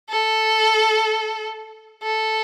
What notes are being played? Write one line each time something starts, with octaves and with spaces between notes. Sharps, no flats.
A4
A4